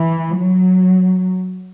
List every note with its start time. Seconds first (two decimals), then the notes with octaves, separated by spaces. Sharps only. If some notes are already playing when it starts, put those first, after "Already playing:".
Already playing: E3
0.36 F#3